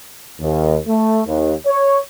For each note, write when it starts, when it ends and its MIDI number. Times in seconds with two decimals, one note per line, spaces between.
0.40 0.77 39
0.87 1.20 57
1.27 1.54 39
1.66 1.98 73